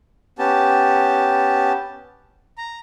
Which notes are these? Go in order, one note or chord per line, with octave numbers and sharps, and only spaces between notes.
B3 C#4 G4 A5
A#5